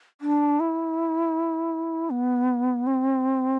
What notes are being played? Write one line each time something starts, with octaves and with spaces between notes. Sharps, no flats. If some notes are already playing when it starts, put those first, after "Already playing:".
D4
E4
B3
C4